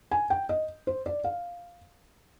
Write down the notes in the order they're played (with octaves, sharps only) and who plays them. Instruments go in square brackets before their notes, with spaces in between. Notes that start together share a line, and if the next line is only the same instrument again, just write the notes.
[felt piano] G#5
G5
D#5
C5
D5
F5